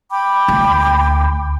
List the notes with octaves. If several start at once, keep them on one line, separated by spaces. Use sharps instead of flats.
G5 B5 D6
D2